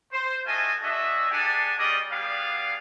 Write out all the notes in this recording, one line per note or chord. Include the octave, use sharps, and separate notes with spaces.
C5
A3 F4 F#4 D#5 G#5 A5
D4 F#4 G#4 D#5 E5
D4 G4 G#4 F#5 G#5 A5
G3 C#4 G#4 D5 D#5
G3 B3 D4 G#4 F5